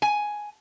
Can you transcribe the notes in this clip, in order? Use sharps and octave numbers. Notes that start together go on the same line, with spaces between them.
G#5